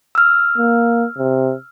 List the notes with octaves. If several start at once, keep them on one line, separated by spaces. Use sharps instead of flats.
E6 F6
A#3
C3